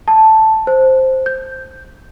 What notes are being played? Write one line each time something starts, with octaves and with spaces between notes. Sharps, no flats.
A5
C5
G6